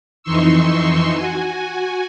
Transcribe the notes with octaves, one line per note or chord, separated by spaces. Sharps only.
F2 E3 D#4 C6 C#6 E6
F#4 G#5